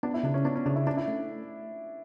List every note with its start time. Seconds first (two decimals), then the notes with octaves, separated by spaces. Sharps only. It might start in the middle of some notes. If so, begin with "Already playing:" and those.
0.03 B3 D4
0.14 E4
0.23 C#3 D4
0.34 C#4
0.45 B3 D4
0.56 C#4
0.66 C#3 D4
0.76 E4
0.87 C#4 D4
0.97 E4
1.08 A3